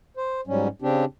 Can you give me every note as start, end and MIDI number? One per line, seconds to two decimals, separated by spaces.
0.17 0.41 72
0.47 0.68 44
0.47 0.68 54
0.47 0.68 55
0.47 0.68 61
0.82 1.05 49
0.82 1.05 60
0.82 1.05 62
0.82 1.05 67